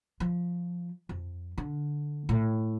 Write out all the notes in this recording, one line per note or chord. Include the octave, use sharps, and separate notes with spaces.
F3
F2
D3
A2